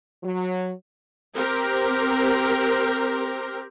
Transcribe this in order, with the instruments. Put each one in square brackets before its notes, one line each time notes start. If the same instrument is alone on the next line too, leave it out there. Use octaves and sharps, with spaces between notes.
[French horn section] F#3
[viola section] C4 G4 A#4